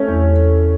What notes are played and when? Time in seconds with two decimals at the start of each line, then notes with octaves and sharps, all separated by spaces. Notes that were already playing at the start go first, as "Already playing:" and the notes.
Already playing: A3 C#4
0.08 E2